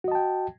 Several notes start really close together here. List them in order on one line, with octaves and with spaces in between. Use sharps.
F#4 D#5 A5 G5